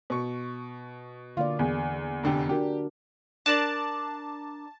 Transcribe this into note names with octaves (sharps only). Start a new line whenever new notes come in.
B2 C#6
D3 A#3 F4 D5
E2
F1 D3 G4
D4 F#4 G4 A#4
D4 A#4 D5 A5